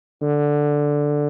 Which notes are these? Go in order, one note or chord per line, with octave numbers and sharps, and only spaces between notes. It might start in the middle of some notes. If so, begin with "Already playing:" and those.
D3